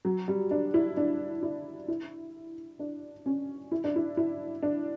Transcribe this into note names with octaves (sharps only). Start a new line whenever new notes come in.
F#3
G3
D4
E4
D4
E4
E4
D4
C#4
E4
D4
E4
E4
D4